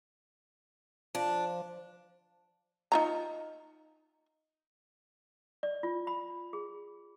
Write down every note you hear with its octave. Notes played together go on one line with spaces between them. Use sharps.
F3 D4
D#4 F4 A#5
D5
F4
B5
G#4